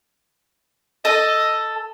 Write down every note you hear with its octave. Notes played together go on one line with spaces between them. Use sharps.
A4 D#5